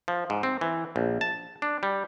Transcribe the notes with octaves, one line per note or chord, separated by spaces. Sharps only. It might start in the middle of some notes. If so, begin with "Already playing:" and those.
F3
G#2
C4
E3
A#1
A5
D4
G3